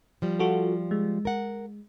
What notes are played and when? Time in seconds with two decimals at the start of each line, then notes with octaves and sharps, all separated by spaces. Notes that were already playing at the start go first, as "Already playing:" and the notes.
0.22 F3 G3
0.39 F4 F#4 A4
0.91 G#3
1.25 A#4 F#5